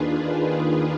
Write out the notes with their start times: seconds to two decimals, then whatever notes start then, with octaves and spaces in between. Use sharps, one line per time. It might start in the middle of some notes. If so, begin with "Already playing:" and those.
Already playing: D#2 D#3 D4 F4 G#4 B4
0.26 D#4
0.57 D#4